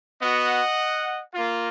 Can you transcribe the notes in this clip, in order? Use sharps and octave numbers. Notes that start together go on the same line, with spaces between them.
B3 F#4 D#5 F#5
A#3 F4